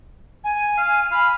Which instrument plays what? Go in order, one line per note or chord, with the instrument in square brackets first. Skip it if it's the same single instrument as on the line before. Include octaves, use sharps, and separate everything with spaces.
[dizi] G#5
[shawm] F5
[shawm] F5 [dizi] B5